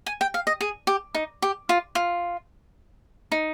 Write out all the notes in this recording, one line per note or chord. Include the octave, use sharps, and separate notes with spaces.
G#5
G5
F5
D#5
G#4
G4
D#4
G4
F4
F4
D#4